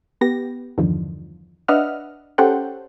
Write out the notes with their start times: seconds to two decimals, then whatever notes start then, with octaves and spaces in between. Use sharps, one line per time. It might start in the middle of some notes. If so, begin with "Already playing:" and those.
0.21 B3 G4 A#6
0.78 E2 G2 D3 D#3 F3
1.68 D4 B4 D#5 E5 F#5 F6
2.38 C#4 G4 A4 C5 F#5 G5